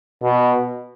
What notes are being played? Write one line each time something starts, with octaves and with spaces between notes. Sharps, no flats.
B2